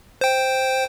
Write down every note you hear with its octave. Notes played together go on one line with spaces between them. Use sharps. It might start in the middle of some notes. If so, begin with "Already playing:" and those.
C5 G5